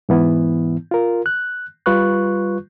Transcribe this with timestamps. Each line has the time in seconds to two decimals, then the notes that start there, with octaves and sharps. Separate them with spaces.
0.09 G#2 E3 B3 E4
0.91 F4 A#4
1.26 F#6
1.86 G3 F4 B4 C#6 F#6